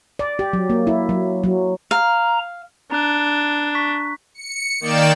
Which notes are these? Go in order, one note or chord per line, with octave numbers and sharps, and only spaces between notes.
D5
G4
F#3
A#3
E4
F#3
F#3
F5 A#5
D4 A#5 F#6
C#6 B6
C#7
D#3 A#3 D5 G5 E7